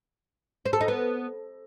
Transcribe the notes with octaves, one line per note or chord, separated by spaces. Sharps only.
C5
A4
D#4
B3